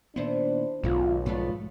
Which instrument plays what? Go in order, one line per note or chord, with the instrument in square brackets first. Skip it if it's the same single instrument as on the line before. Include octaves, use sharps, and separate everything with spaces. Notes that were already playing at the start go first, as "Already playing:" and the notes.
[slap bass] A#2 D#3 B3 [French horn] D4 [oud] E4 C5
[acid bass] B1 [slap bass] G#2 B2 D#3 [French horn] F4
[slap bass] G#2 [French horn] F3 [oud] A3 B3 D4